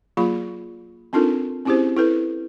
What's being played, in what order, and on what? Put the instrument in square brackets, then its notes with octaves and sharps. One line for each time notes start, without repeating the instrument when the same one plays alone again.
[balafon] F#3 A#3 F4 G#4 B5
C4 D4 D#4 F4 A4 A#4
C4 C#4 E4 G4 G#4 C5
E4 A4 B4